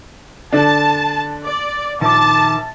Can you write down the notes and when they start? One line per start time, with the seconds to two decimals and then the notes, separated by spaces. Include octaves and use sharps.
0.53 D3 D4 A5
1.46 D5
2.01 A#1 D#3 A5 D6